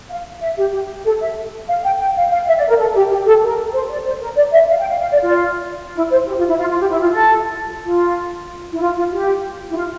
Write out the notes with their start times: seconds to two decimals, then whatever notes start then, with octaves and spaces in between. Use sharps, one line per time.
0.10 F5
0.41 E5
0.57 G4
0.73 G4
1.04 A4
1.21 E5
1.68 F5
1.84 G5
1.99 G5
2.16 F5
2.31 F5
2.47 E5
2.58 D5
2.68 A#4
2.79 A4
2.95 G4
3.10 G4
3.27 A4
3.42 A#4
3.74 C5
3.90 D5
4.06 C5
4.21 A#4
4.37 D5
4.53 E5
4.69 F5
4.79 G5
4.90 F5
5.01 F5
5.11 D5
5.21 F4
5.95 E4
6.11 C5
6.27 G4
6.38 F4
6.48 E4
6.59 F4
6.70 F4
6.80 G4
6.90 E4
7.01 F4
7.12 A4
7.85 F4
8.73 E4
8.81 F4
8.96 F4
9.12 G4
9.71 E4
9.75 F4